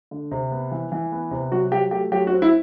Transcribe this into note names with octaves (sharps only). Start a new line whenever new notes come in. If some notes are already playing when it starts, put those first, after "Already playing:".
D3
C3
B3
E3
E3
B3
C3
F#3 F#4
F#3 G4
A3 G4
F#3 G4
F#4
C4
E4